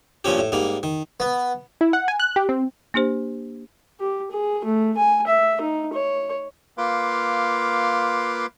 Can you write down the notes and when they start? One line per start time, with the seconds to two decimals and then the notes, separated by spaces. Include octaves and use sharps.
0.25 G2 A#2 F3 C#4 G4
0.38 A2
0.52 G#2 G3 A#3
0.83 D#3
1.20 B3
1.81 E4
1.93 F#5
2.08 G#5
2.20 F#6
2.36 G4
2.49 C4
2.94 A#3 D4 G4 C5
4.00 G4
4.31 G#4
4.65 A3
4.97 G#5
5.27 E5
5.61 D#4
5.94 C#5
6.78 A#3 F4 B4 F5 C6 D6